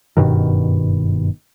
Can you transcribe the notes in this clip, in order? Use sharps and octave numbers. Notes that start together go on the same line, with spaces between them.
F#1 G2 B2 D#3